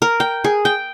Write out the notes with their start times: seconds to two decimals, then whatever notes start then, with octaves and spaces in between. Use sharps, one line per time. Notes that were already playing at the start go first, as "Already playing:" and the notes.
0.02 A#4
0.20 G5
0.44 G#4
0.65 G5